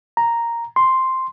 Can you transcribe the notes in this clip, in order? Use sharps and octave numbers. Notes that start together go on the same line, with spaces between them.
A#5
C6